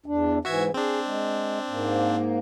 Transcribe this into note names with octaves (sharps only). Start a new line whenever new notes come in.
E2 D4
G#2 E3 F#4 E5 G#6
C4 D4 G#4
G#3
G#2 A#3